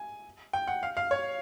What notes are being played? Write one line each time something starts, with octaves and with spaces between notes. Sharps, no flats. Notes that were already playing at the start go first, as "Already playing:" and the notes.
Already playing: G#5
G5
F#5
F5
F5
C#5